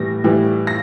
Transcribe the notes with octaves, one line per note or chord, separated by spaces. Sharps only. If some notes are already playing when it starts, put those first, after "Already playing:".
Already playing: A2 E3 G3 A#6
A2 E3 G3
A#6